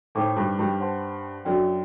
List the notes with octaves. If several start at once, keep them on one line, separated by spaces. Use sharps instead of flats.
A2 A3 D#4 A4 C5 G5 D6
G2 G3
G2 G3
C5 F#5 A5 C6
F#2 F#3 D4 A4 D5 G5